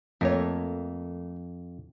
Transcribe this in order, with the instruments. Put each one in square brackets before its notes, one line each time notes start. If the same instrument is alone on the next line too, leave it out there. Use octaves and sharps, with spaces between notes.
[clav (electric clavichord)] F2 [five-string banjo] A3 A#3 C#5